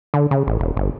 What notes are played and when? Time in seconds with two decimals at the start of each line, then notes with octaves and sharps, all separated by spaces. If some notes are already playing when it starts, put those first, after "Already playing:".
0.14 D3
0.31 C#3
0.47 A1
0.60 E1
0.77 G1